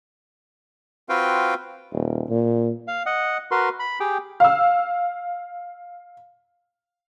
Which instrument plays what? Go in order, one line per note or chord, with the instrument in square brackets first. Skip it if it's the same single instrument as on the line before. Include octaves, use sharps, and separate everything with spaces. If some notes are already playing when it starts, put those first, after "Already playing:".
[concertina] C4 F4 F#4 B4 F5 G5
[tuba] D#1
A#2
[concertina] F5
D#5 F#5
F#4 A#4 B4 C6
B5
G4 G#4 G5
[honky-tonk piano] F5 E6